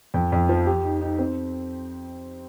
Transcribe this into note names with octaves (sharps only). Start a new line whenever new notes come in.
F2
F2
F3
G4
D#4
D#4
C4